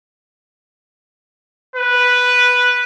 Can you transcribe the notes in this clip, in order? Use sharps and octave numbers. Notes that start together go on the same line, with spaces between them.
B4